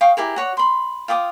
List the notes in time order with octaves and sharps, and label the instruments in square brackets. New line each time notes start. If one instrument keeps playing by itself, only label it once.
[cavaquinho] F5 G5 C#6 D#6
E4 G4 G#4 A#4
F#4 C#5 F#5
B5 C6
F4 G5 D6 D#6